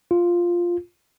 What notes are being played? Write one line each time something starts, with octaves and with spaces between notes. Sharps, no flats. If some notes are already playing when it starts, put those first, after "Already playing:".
F4